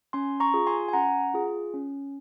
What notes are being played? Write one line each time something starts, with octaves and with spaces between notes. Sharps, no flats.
C#4 G#5 C6
A#5 C#6
F4 G#4
G#5 C6
G#5
C#4 F#5 A#5
F4 G#4
C#4